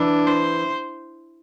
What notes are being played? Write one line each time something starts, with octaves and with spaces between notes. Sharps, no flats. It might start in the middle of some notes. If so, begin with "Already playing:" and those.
Already playing: E3 D4
C5